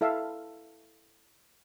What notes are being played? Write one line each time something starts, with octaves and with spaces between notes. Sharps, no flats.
E4 A4 E5 F5